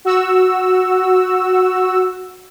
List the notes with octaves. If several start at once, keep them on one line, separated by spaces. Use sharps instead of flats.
F#4 E6